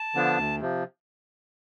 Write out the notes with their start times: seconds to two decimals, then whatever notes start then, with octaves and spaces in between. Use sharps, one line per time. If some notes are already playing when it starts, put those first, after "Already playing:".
Already playing: A5
0.15 D3 F3 B3 D4
0.38 D2
0.60 C3 F3